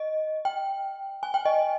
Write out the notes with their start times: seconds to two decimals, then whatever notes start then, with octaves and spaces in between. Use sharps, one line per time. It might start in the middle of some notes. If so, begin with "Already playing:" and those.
Already playing: D#5
0.45 G5
1.23 G#5
1.34 G5
1.45 D#5